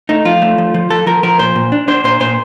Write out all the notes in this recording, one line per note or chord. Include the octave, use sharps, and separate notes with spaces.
A3 D#4
F3 F4
A3
F3
F3
F3 A4
F3 A#4
F3 A#4
A#2 C5
A#2
D4
D4 C5
A#2 C5
A#2 C5